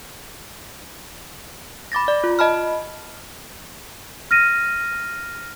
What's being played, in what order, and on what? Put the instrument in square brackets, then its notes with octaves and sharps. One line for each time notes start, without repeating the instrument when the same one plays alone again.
[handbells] B5 D6 A6 A#6
D5
F4
D#5 A5 B5 F6
[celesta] F6 A#6 D#7